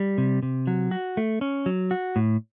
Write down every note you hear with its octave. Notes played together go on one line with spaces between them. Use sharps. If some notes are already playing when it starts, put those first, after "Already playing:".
Already playing: G3
C3
C3
F#3
F#4
A3
C#4
F#3
F#4
A2